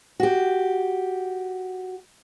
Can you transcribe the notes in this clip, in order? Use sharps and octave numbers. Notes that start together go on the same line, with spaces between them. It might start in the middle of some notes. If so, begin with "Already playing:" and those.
F#4 G4